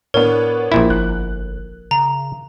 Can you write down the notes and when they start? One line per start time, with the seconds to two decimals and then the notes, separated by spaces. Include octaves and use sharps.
0.14 A2 B3 D4 A#4 C#5
0.72 A#1 A#2 E4
0.90 G1 F#6
1.91 C#3 A#5